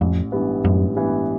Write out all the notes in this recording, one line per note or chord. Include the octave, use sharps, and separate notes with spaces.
A1 F2
G2 E3 G3 B3
A1 F#2
G2 E3 G3 B3